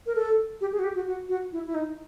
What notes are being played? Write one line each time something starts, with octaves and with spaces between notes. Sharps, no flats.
A#4
A4
G4
G#4
F#4
G4
F#4
F#4
F#4
E4
E4
D#4